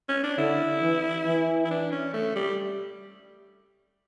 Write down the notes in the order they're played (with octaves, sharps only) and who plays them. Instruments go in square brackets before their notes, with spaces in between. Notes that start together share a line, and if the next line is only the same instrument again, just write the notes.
[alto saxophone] C#4
D4
[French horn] D3 [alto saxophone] E4
[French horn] E3
E3
[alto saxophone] E4
D4
C#4
A3
G3